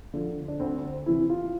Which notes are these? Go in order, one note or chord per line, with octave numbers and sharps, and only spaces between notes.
D3 F3
D4
D2 C4
C3 E3 E4
F4